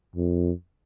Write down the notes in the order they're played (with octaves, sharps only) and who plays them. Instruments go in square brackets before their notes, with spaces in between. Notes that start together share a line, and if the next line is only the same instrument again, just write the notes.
[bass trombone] F2